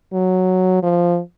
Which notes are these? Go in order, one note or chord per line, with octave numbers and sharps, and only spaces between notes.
F#3
F3